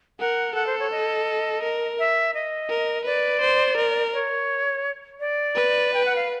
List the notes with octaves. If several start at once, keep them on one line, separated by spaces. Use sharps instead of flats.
A#4 F#5
A4 F#5
C5
C#5
D#5
A#4
E5
D#5
A#4
B4 D5
C5
A#4
C#5
D5
B4
G5
F#5
F5